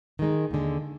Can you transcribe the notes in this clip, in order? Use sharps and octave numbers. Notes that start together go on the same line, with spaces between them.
D#3 G#3 D#4
D#2 D3 G#3